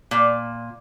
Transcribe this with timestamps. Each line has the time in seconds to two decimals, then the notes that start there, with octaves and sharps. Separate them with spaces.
0.11 A#2